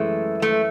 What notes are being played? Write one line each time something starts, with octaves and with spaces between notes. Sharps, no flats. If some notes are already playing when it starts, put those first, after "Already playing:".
Already playing: F#2 E3 G#3 A3
A3